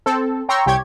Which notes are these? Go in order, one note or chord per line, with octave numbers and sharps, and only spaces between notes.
C4 A4
C#5 G5 A#5 C6 C#6 E6
C2 G4 C#5 G#6